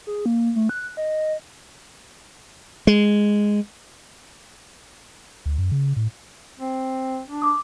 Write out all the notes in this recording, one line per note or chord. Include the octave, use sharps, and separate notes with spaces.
G#4
A#3
A3
F#6
D#5
G#3
D2
F#2
C#3
A2
C4
D4
D6 D#6